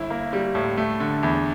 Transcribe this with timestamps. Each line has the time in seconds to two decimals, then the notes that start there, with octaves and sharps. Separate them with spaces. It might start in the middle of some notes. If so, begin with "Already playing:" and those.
Already playing: G1 E4
0.10 A#3
0.33 G3
0.55 A2
0.77 A3
1.00 D3
1.23 E2